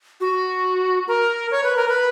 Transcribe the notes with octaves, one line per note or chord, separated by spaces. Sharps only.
F#4
A#4
C#5
B4
A#4
B4